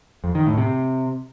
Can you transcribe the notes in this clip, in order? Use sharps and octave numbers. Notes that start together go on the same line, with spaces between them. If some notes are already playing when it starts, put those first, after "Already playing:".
F2
D#3
A2
C3